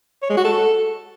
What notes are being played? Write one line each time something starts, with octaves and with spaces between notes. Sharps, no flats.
C#5
G#3
F#4
A4